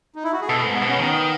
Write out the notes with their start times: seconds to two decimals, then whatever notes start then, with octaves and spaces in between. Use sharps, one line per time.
0.15 D#4
0.24 E4
0.32 F#4
0.41 G#4
0.48 B2 A4
0.65 G#2
0.73 B3
0.82 B2
0.88 C#4
0.99 D#3 B3